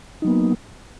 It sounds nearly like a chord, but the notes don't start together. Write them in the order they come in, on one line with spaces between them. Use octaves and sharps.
D#4 F#3 B3 A#3